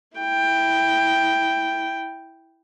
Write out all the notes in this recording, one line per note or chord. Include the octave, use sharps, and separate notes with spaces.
E4 G5